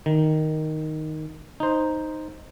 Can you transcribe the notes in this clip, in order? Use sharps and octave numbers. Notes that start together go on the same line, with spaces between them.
D#3
D#4 C5